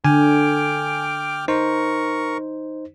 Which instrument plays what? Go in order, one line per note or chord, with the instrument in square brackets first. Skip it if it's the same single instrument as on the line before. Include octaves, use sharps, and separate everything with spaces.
[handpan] D3 [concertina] G5 D6 F6 [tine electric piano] G#5
[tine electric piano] D#4 C5 [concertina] A#4 C#6